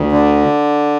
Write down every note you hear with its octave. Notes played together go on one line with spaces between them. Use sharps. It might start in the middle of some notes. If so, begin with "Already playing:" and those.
Already playing: D2
D3